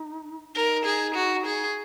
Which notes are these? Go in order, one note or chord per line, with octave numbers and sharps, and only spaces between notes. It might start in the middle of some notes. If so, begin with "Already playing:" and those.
Already playing: D#4
D#4 A#4
G#4
F#4
G#4